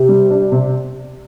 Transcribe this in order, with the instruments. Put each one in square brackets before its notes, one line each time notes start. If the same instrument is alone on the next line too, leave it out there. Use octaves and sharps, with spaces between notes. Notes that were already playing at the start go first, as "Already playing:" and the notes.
Already playing: [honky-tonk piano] C3 [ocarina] G4
[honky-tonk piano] G3
D4
C3